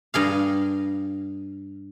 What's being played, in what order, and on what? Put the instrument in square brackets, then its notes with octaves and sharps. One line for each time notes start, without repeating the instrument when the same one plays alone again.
[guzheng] G2 G#4 F5